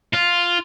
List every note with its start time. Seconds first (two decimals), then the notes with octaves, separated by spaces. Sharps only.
0.13 F4